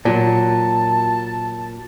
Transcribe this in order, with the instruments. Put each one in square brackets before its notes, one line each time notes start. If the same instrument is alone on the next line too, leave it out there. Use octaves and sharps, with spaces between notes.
[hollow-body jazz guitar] A#2 F#3 [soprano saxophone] A5